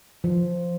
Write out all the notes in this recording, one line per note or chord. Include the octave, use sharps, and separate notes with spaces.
F3